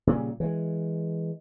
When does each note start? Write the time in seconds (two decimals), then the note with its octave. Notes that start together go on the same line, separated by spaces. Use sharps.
0.07 A#2 C#3 G3
0.40 E3 G#3